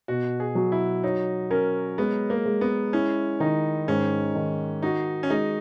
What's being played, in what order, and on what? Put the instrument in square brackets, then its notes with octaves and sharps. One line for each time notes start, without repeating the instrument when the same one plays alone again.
[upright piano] B2 [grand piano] F#4
[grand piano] G#4
[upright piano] F#3
[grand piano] E4
[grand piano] D#4 [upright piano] C#5
[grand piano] C#4 [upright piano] A#4
[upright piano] G#3 [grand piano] B3
[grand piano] A#3
[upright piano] G#3
[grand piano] B3
[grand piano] C#4 [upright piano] E4
[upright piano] D#3 [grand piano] D#4
[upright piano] G#2 [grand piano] C#4
[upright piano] D#3
[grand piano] D#4 [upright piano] F#4
[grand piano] C#4
[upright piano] G#3 [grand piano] D#4